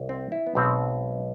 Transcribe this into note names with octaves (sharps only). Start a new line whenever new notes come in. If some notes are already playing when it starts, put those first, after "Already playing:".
Already playing: C2
C4
E4
B3
B1 B2 G#3 C4